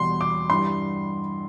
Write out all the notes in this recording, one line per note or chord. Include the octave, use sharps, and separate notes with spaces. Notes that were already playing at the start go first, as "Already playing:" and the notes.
Already playing: E2 B2 G3 C6
D6
G2 E3 G3 C6